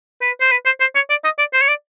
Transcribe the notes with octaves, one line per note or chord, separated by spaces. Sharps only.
B4
C5
B4
C5
C5
C#5
D5
D#5
D5
C5
C#5
D5